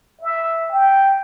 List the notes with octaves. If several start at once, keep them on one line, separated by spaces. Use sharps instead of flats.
E5
G5